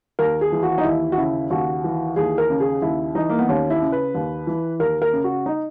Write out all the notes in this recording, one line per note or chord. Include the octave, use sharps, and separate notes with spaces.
D#2 A#4
G#4
E3
F#4
D#4
D#2 E4
F#4
C#3 E4
D#2 F#4
E3
D#2 G#4
A#4
C#3
G#4
D#2 E4
E3 D#4
A#3
B3
D#2 C#4
E4
C#3
B4
D#2
E3
D#2 A#4
A#4
C#3
F#4
D#4